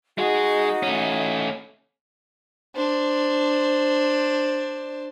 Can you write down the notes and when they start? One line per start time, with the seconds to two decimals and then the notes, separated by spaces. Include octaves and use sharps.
0.18 G#3 D#4 F#4 G#4 D#5
0.83 A3 C#4
2.75 D4 C5